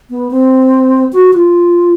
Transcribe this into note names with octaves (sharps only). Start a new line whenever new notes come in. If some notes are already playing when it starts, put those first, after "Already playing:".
B3
C4
F#4
F4